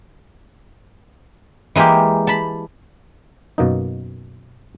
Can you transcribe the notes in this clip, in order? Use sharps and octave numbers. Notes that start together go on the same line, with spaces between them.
E3 G#3 A#3 G4
A5 B5
F#2 B2 A#3 D#4